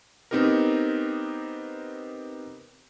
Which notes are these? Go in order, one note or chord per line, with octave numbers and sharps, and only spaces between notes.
B3 C4 D#4 G4 A#4